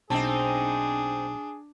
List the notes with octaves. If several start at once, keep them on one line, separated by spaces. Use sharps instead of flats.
B1 C4 D4 D#4 G#4 A5